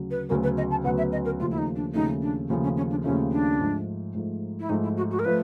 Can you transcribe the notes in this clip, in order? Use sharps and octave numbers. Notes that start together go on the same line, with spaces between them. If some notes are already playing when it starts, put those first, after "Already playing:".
Already playing: D2 C#3 F#3
B4
D2 C#3 F#3 B3 A#4
B4
D#5
A5
D2 C#3 F#3 B3 F#5
E5
D#5
A#4
D#2 C#3 F3 A3 F4
E4
D#4
D4
D#2 C#3 F3 A3 D#4
D4
D#2 C#3 F3 A3 C#4
C#4
C#4
D4
D#2 C#3 F3 A3 C#4
D4
G#2 F3 A3
G#2 F3 A3
E4
G#2 F3 A3 D#4
E4
F#4
F#4
A#4
F3 A3 B4